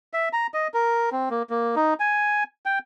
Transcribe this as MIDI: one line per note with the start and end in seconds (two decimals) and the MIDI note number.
0.13 0.29 76
0.33 0.47 82
0.54 0.68 75
0.74 1.10 70
1.12 1.29 60
1.30 1.43 58
1.50 1.75 58
1.76 1.94 63
2.00 2.44 80
2.66 2.79 79